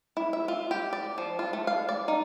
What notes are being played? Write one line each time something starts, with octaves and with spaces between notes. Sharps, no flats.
E4
E5
F4
G4
D5
F3
F4
A3
F5
D5
D#4